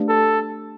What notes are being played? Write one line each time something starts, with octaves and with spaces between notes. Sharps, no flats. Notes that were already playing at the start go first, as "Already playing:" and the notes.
Already playing: A3 D4 G4 B4 D5
A4